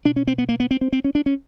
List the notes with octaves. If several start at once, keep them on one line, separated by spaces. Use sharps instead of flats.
B2 D4
C#4
C4
B3
A#3
B3
C4
C4
C4
C#4
D4
C#4